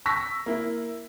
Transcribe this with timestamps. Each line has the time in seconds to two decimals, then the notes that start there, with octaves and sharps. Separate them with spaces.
0.06 C#6 E6 A#6 B6
0.46 A#3 E4